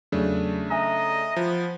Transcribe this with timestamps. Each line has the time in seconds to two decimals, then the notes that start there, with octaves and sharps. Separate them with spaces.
0.12 E2 C#3 F#3 A3 D4
0.70 D#5 E5 G#5 A#5
1.36 F3 B3